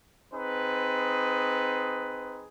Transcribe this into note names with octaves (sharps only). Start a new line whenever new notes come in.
C4 D#4 G#4 B4